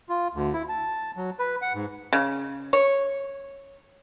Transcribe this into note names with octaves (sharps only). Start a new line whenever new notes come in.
F4
D2
E4
A5
F#3
B4
F#5
G#2
C#3
C#5